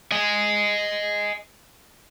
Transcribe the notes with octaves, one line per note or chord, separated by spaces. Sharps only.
D#5 G#5